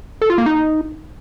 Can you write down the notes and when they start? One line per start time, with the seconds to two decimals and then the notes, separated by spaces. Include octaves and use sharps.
0.22 A4
0.30 F4
0.38 A#3
0.46 D#4